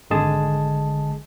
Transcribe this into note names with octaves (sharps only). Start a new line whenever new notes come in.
G#1 D3 G#3 G#4 A5